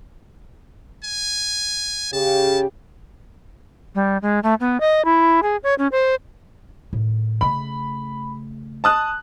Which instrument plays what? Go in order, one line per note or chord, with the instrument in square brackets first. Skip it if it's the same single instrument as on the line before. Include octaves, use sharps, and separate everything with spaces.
[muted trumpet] G#5
[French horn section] C#3 G4 [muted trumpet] A5
[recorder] G3
G#3
A3
B3
D#5
E4
G#4
C#5
C#4
C5
[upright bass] A2 D#3
[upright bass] C#3 A3 [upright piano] B5
[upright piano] A5 D#6 F#6